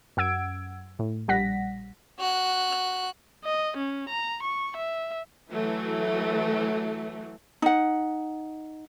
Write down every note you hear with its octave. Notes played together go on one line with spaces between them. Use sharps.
F#2 F#5 E6 G#6 D7
A2
A#1 G3 F#5 A#6 B6
F#4 F#6
D#5
C#4
A#5
C#6
E5
E3 F#3 A3
D#4 F#5